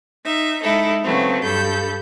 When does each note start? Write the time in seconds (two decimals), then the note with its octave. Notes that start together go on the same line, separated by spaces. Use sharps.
0.24 D#4 E5
0.64 G#3 D#4 E4 A4
1.03 C#3 F#3 A3 B3 C4
1.44 G2 A4 B5 G6